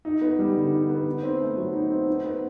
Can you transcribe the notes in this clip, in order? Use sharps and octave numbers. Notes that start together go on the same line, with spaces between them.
D#4
B3
G3
D3
D#4
B3
D#4
C4
A3
F#3
D#4
C4
D#4
B3